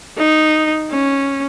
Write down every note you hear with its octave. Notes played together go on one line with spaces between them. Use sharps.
D#4
C#4